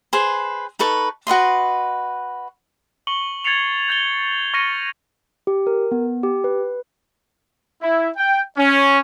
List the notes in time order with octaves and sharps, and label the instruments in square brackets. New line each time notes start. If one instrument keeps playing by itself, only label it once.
[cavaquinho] G#4 B4 C5
D#4 A4 B4 C#6
F#4 B4 D#5 C6
[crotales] C#6 C#7 F#7 G7
G#6 A6 C7 C#7 F7
G6 A6 G7
C#6 F6 A#6 C#7 D#7 G7
[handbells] G4
A#4
B3
G4
B4
[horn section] E4
G5
C#4